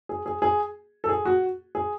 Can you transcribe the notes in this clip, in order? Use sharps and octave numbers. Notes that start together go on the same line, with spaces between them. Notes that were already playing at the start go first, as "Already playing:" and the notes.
G#4
G#4
G#4
A4
G#4
F#4
G#4